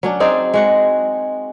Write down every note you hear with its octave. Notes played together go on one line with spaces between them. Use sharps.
F#3 C#4 D4
C4 D#4 G#4 D5
G#3 F#4 F#5